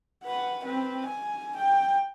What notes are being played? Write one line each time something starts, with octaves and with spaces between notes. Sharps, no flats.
B4 F#5
C4 B4
G#5
G5